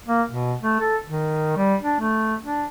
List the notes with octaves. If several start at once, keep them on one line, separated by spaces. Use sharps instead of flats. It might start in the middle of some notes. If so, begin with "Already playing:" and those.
A#3
B2
A3
A4
D#3
G3
D4
A3
D4